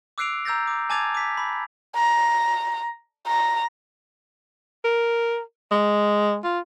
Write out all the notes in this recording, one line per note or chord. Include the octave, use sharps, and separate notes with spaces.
D6 E6 F#6 C7 D7 F7
A#5 E6 G6 A6 A#6
D6
G#5 A5 D6 G#6 A6 F7
D6 B6
B5
A#5
A#5
A#4
G#3
F4